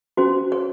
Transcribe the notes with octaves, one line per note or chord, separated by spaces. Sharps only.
C#4 F#4 C5
C#5